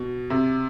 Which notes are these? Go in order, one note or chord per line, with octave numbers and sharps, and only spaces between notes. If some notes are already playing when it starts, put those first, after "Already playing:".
Already playing: B2
C3